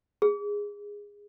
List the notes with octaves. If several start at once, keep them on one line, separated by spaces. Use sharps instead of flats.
G#4